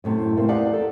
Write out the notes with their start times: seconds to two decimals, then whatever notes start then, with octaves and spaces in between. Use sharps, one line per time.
0.04 F#2 A2 C3
0.36 A3 A#3 C4
0.48 E2 D#4 G4 D5 F5 F#5
0.73 A4